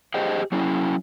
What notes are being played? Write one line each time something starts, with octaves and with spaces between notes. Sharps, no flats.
G4 G#4 C5 D#5 G5
F#3 C#4 E4